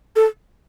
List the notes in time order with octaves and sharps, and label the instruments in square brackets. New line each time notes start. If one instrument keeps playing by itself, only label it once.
[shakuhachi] A4